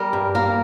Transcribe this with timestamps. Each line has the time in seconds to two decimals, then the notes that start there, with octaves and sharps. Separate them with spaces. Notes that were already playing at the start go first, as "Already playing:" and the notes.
Already playing: G3 A#4
0.13 G2
0.35 A#3 A#4